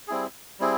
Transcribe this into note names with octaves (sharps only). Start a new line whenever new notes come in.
G3 C4 E4 G#4
G3 C4 E4 G#4